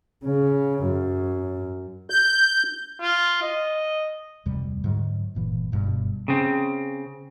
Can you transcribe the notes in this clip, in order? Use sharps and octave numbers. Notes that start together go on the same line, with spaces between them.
C#3
F#2
G6
F4
D#5
D1 F2 C3 G3
G#2 D3 F#3
G1 A#2 E3
F#1 G2 B2
C#3 C4